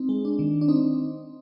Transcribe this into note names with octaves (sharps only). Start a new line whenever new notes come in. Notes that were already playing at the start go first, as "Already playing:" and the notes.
Already playing: C4 D#4
G#3
D4
D#3
D4
C4 D#4